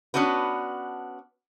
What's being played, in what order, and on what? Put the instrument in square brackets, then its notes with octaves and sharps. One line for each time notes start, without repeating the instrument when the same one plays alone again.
[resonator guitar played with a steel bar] B3 C#4 D4 F#4 B4